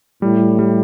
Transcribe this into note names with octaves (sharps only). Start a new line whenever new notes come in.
A2 G3
G3